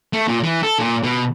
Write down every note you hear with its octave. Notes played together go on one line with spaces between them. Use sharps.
A3
A#2
E3
A4
A#2
B2